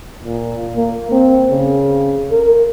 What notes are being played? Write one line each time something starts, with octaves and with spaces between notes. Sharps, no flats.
A#2
A#3
C4
C#3
A#4